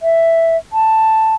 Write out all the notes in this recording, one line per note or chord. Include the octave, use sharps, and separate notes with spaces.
E5
A5